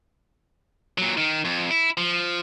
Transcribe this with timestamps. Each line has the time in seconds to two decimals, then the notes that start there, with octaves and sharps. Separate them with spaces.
0.98 A#2 F#3
1.17 D#3
1.45 F2
1.71 E4
1.97 F3